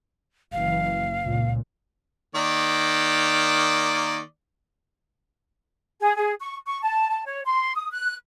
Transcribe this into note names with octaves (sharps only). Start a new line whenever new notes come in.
F#1 E3 F5
C#2 A#2
D#3 A#3 D5
G#4
G#4
C#6
C#6
A5
A5
C#5
C6
D#6
F#6